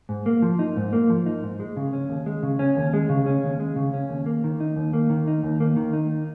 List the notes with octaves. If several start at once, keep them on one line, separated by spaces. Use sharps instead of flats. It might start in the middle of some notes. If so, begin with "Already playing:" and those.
G#2
A#3
F3
D#4
G#2
A#3
F3
D#4
G#2
G#3
C#3
C#4
D#2
G#3
C#3
C#4
D#2
G#3
C#3
C#4
D#2
G#3
C#3
C#4
D#2
A#3
D#3
D#4
D#2
A#3
D#3
D#4
D#2
A#3
D#3
D#4